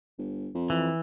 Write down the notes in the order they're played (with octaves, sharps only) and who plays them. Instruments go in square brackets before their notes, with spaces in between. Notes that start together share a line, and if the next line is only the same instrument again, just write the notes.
[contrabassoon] G1
F2
[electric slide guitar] E3